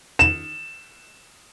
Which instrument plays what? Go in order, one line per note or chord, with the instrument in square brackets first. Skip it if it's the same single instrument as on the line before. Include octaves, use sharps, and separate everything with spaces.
[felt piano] E7